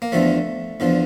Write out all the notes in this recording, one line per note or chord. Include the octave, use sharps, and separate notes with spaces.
A#3
E2 D3 F3 A3
E2 D3 F3